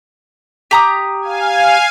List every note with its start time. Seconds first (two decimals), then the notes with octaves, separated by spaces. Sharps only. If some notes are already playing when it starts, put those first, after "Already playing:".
0.71 G4 A#5 D#6
1.22 F5 G#5